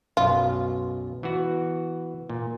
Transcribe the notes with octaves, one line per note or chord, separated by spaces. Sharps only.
B1 F#2 B2 F4
E3 B3 F#4
A#2